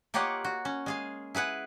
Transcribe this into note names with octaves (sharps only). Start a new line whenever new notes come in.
A#3 F4 G4 C#5 D#5 F#5
F#4
C#4
G#3 G#4 F5
E4 G#4 B4 F#5